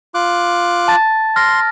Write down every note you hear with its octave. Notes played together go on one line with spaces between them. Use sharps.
F4 D6 F#6
A5 A6
C6 F6 A#6